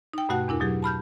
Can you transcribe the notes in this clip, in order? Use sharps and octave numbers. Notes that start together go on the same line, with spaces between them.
D#4 G5
G2 B2 A3 F#4 F#5 F#6
E2 D4 E4 A#4
B2 F#3 G4 G#4
A5 B5 F6 G6